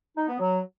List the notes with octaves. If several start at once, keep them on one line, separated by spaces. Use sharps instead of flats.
D#4
B3
F#3